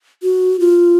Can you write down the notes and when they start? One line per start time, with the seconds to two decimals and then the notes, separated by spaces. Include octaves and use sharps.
0.23 F#4
0.60 F4